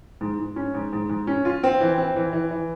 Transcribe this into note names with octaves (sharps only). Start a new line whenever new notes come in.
G#2
G#2
C#4
G#2
G#2
G#2
C#4
F4
C4
E3
C4
E3
E3
E3